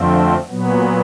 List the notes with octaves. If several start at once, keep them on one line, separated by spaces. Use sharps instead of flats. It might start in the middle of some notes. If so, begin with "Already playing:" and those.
Already playing: F2 D3 F3 A3 C4
A#2 F#3 B3